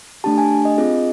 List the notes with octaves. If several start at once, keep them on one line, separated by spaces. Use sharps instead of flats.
A3 D4 G4 A5
G#5
D#5
C4 F4 G#4